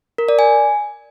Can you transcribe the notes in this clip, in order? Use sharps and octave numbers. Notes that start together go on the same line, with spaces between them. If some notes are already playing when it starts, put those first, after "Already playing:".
A#4
D5
G#5